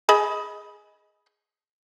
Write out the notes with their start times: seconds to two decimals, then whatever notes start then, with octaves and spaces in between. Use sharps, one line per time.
0.09 G#4 D#5 B5